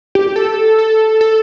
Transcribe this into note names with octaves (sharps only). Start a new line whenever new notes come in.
G4
A4
A4
A4